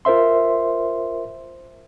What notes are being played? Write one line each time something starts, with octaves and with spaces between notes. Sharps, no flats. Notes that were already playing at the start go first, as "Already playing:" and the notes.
F4 A#4 C5 E5 C6